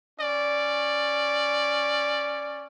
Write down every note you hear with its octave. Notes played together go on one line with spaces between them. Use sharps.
C#4 D5